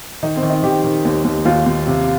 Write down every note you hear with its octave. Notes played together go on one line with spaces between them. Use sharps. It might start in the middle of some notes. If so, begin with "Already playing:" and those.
D#3 D#4
C4
D#3
D#4
D#3 G4
D#3
D#2
D#2
D#2 F4
D#2
C3